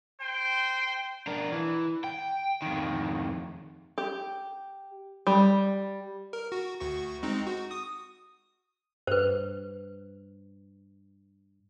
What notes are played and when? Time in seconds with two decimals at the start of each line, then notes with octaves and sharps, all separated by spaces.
0.21 C5 G5
1.27 D4 A#4
1.52 E3
2.04 G5
2.62 F2 D#3
3.98 G4
5.27 G3
6.33 A#4
6.52 F#4
6.80 D2 F#4 C#6
7.23 G#3 C4 D#4
7.47 F#4
7.71 D#6
9.07 G2 B4 C5